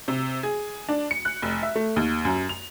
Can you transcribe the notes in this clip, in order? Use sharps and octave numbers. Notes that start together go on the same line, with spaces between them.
C3
G#4
D4
C#7
F#6
F1
E5
A3
D#2
F#2
F7